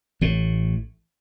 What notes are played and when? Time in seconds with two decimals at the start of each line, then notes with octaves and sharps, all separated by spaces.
0.21 A1 A2